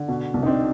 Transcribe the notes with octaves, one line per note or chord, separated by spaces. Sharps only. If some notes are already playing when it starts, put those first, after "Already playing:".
Already playing: D3
B2
C2
D#4
C4 D4